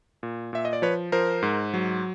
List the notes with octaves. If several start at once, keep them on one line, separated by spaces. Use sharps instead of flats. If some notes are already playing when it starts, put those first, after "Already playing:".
A#2
A#2 E5
D#5
D5
F3 B4 C#5
F3 A#4 C5
G#2
F#3